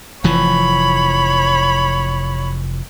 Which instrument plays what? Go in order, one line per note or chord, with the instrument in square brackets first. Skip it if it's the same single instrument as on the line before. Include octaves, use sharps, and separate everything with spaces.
[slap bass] F1 E3 F3 [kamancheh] C#5 B5